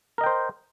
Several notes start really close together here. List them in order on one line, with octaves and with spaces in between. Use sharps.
A#4 D#5 G5 C5